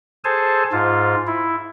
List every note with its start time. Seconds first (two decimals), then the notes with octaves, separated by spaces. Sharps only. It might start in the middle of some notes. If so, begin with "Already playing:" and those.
0.25 G#4 A4 C5 G#5 A5
0.72 G#2 F4
1.27 E4